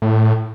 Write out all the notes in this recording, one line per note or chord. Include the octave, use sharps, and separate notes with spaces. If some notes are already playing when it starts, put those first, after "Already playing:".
A2